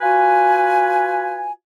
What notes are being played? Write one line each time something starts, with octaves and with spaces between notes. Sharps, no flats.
F4 F#4 B4 G#5